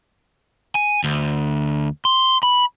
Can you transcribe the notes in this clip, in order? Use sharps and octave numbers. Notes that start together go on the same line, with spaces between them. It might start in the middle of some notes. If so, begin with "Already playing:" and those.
G#5
D2
C6
B5